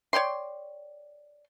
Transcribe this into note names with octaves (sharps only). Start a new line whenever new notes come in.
C#5 D5 G5 C6